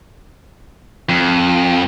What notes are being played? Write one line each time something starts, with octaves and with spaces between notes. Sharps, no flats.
F2